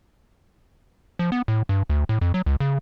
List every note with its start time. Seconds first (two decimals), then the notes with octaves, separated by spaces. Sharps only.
1.19 F3
1.32 B3
1.48 A2
1.69 G2
1.90 D2
2.09 A2
2.21 F2
2.34 F#3
2.46 C#2
2.60 C#3